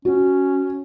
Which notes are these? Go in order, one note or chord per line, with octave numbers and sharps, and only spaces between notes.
C#4 F#4